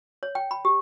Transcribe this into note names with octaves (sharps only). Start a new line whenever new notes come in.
C#5
G5
B5
G4